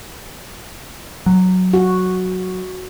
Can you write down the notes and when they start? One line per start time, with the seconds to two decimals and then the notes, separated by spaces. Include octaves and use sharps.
1.26 F#3
1.73 F#4